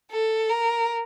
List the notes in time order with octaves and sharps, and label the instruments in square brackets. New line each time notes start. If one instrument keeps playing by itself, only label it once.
[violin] A4
A#4